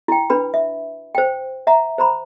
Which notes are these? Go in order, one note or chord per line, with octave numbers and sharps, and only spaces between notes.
E4 G5
D4 B4 B5
E5
C5 G5
E5 F#5 A#5
C5 A#5 B5